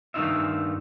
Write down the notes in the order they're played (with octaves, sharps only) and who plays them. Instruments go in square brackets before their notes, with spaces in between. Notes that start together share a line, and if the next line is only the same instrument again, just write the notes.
[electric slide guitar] G2 D#3 A3 D#4 F4 E5